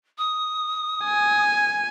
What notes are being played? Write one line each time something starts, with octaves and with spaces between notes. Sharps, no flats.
D#6
G#5